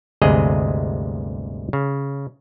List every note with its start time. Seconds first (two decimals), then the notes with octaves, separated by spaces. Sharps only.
0.22 G1 D2 C3 G#3 G#4 D#5
1.73 C#3